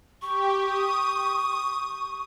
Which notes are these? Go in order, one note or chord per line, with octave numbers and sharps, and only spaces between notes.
G4 C#6
D#6